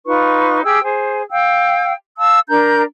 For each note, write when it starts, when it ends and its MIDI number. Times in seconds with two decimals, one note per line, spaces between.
0.06 0.61 63
0.06 0.61 65
0.06 0.61 71
0.06 0.61 85
0.63 0.81 67
0.63 0.81 68
0.63 0.81 79
0.63 0.81 88
0.83 1.22 68
0.83 1.22 72
1.30 1.93 77
1.30 1.93 79
1.30 1.93 88
2.17 2.39 77
2.17 2.39 81
2.17 2.39 88
2.48 2.82 62
2.48 2.82 70
2.48 2.82 82
2.48 2.82 91